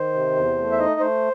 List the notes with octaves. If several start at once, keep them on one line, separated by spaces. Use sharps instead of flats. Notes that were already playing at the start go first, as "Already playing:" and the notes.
Already playing: D#3 C5
C3
E2
A3
E5
D#4 D#5
A3 C5